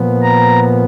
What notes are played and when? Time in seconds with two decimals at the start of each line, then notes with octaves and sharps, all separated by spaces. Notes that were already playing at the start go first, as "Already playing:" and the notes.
Already playing: A#2 F3 B3
0.23 A#5